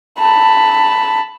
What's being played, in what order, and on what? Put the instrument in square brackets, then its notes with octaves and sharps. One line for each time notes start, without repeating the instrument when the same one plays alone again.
[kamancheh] A5 B5